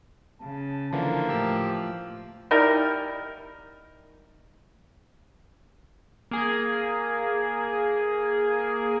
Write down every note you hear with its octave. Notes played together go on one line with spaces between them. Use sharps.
C#3 A5
D3 E3 F3 A#3
A2 F3 G4 E6
G3 D#4 E4 A#4
A#3 G#4